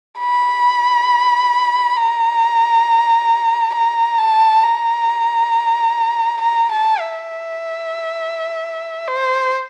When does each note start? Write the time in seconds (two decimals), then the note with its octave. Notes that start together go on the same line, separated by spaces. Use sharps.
0.20 B5
1.97 A#5
3.75 A#5
4.19 A5
4.63 A#5
6.41 A#5
6.71 A5
7.00 E5
9.08 C5